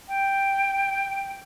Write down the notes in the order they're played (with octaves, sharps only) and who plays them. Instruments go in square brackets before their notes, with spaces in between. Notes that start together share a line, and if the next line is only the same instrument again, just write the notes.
[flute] G5